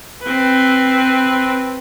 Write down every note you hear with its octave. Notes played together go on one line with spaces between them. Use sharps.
C4 B4